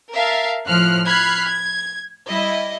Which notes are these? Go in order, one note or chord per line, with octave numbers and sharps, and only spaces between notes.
A#4 E5 F5 A5
A2 F3 F6 F#6
B5 F6 F#6 G#6 C7
G#6
G3 E4 D#5